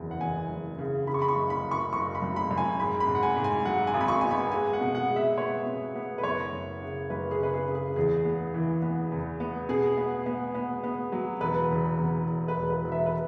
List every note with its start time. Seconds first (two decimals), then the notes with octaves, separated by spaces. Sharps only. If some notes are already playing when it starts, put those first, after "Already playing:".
Already playing: F#1 E2
0.11 F#5
0.21 E2 G#5
0.49 F#1
0.78 C#3
1.07 C#3 B5
1.14 C#6
1.22 B5
1.28 C#6
1.36 F#1
1.50 B5
1.65 F#1
1.71 C#6
1.93 F#1 C#6
2.15 B5
2.22 F#2
2.36 B5
2.51 F#2
2.58 G#5
2.79 G#2 B5
3.00 B5
3.08 G#2
3.15 F#5
3.23 G#5
3.37 G#2
3.44 G#5
3.65 F#3 F#5
3.87 G#5
3.94 G#1
4.01 B5
4.08 C#6
4.21 B3 G#5
4.31 B5
4.52 G#3 G#5
4.73 F#5
4.81 B2
4.95 F#5
5.09 G#3
5.16 E5
5.38 B3 C#5
5.66 B2
5.95 B3
6.18 B4
6.23 F#1 C#5
6.52 F#1
6.81 C#3
7.10 F#1 B4
7.31 G#4
7.39 C#3 B4
7.54 G#4
7.67 C#3
7.75 G#4
7.96 E2 G#4
8.25 B3
8.54 E3
8.82 B3
9.12 E2
9.40 B3
9.69 B2 G#4
9.97 B3
10.26 B3
10.55 B3
10.83 B3
11.12 F#3
11.40 E1 B4
11.70 E2
11.98 E2
12.27 E2
12.48 B4
12.56 E1
12.70 B4
12.84 E1
12.92 E5
13.06 B4